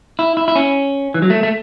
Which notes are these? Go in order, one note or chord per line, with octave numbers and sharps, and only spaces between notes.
E4
E4
E4
C#4
E3
F#3
A3
A3